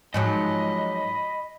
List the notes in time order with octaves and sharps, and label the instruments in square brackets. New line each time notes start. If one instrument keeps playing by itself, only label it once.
[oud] G#2 F3 F#3 [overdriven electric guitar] D#5 [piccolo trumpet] B5